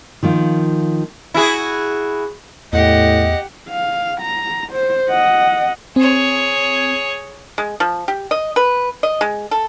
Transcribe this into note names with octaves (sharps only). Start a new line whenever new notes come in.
D#3 F3 A#3
E4 F#4 G#4
E2 A2 G4 D#5 F#5
F5
A#5
C5
D#5 F#5
C4 G#4 C#5
G#3
F3
G4
D#5
B4
D#5
G#3
A4